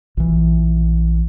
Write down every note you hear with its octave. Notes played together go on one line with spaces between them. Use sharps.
A#1 E3